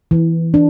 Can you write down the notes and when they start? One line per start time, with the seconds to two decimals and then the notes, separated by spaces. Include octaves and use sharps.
0.11 E3
0.54 D4